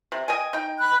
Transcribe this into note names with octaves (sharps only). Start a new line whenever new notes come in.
C3
D#5 G5 G#5
D#4 G5
B5 F#6